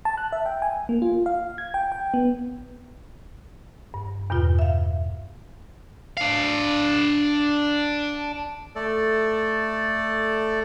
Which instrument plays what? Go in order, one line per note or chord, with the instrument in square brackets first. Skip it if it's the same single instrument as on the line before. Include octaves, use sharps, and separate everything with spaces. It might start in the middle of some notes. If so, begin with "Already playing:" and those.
[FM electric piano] A5
F#6
E5
G5
G#5
A#3
F4
F5
G#6
G5
G5
B3
[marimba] G2
E2 G2 B2 F4
E5 F5
[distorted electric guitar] D4 F5
[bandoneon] A3 A4 D5